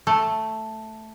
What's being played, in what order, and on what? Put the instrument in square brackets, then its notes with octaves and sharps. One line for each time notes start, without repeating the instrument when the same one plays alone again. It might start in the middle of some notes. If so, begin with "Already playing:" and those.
[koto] A3